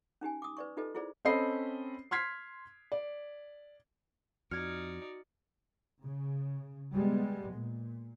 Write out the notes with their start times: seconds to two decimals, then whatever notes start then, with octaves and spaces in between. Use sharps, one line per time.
0.21 C#4 D#4 G4 G#5
0.42 D6 D#6
0.57 B4 D5 C#6
0.77 D#4 F4 G4 A4 B4 D#5
0.95 E4 F4 G#4 C5 D5
1.25 C4 C#4 A4 D#5 B5 C7
2.11 C6 F6 G#6 B6 C7
2.92 D5
4.51 F2 D#4 F#4 D5 F6 G#6 C#7
6.03 C#3
6.92 G3 G#3 B3
7.52 A#2